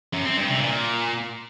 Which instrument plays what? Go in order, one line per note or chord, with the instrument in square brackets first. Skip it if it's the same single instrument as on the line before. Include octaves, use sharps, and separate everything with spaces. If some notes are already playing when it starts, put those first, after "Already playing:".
[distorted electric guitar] F#2
C4
G2
C3
A#2